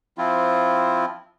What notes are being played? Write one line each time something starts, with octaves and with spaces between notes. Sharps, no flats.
F3 C4 E4 F4